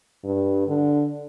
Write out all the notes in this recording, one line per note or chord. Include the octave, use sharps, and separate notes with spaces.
G2
D3